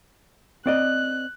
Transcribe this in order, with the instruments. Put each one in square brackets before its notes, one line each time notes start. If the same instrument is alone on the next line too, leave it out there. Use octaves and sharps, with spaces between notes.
[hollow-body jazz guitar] C4 D5 D#5 [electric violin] F#6